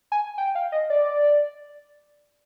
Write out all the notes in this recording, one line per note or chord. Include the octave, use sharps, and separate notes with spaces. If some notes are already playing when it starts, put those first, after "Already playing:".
G#5
G5
F5
D#5
D5